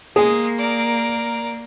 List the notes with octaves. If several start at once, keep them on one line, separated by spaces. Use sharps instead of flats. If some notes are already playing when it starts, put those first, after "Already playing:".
G#3 A#3 G#4
A#4 D5